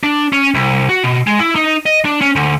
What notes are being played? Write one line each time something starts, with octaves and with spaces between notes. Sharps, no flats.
D4
C#4
C2
F#4
B2
G#3
E4
D#4
D#5
D4
C#4
D2